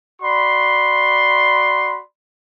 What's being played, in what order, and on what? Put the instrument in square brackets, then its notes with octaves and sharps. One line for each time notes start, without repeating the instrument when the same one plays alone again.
[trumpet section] F#4 D5 B5 C6